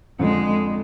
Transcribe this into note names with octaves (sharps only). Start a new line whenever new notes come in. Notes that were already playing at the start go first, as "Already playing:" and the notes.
F2 D3 F3 G#3